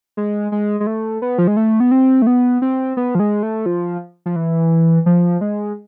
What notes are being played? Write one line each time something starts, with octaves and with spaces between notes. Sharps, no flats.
G#3
G#3
G#3
A3
B3
F3
G#3
A3
B3
C4
A3
B3
C4
B3
F3
G#3
A3
F3
F3
E3
F3
G#3